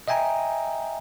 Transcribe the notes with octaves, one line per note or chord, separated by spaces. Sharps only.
D#5 E5 G5 G#5 A#5